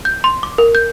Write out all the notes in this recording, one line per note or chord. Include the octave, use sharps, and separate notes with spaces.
G6
C6
D6
A#4
G6